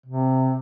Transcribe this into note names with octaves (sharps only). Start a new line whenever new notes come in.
C3